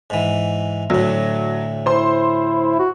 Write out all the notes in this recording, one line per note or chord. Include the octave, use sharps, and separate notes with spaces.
G#2 E3
D2 A2 F#3
E4 C5 C6
F#4